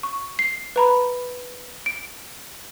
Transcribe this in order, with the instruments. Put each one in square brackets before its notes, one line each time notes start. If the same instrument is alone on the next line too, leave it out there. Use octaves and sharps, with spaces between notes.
[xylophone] C#6
C7
B4 A#5 B5
D7